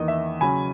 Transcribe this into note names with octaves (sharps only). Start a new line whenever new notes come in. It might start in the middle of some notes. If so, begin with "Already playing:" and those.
Already playing: E2 D#3 A#3 D#5
E5
C#3 F#3 C#4 G#5 B5